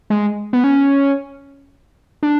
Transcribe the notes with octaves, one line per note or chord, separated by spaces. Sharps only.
G#3
B3
C#4
D4